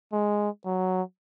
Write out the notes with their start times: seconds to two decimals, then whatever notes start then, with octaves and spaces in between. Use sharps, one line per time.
0.12 G#3
0.65 F#3